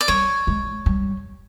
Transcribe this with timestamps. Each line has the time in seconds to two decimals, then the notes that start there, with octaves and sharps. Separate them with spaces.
0.01 D5
0.08 G3 C#5
0.47 G#3
0.86 G3